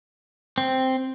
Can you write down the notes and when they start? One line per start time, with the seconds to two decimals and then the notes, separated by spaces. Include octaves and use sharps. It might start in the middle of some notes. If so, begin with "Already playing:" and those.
0.58 C4